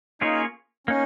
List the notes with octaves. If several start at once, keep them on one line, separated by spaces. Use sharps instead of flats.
A#3 C#4 D#4 F4 G#4 C#5
A#3 C#4 D#4